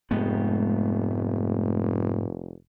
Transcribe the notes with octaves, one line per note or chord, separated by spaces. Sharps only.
F1 G#2 G#3 A3 B3 G4